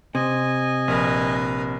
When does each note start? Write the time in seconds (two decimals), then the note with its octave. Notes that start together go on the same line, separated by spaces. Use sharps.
0.15 C3 D#5 G#5
0.88 A#1 A#4 B4